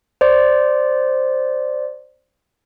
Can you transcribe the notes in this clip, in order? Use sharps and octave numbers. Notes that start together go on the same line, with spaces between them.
C5 D5